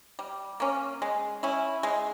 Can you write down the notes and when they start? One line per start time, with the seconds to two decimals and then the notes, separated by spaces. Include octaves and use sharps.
0.19 G3
0.60 A#3 C#4
1.02 G#3
1.43 C#4 E4
1.83 G#3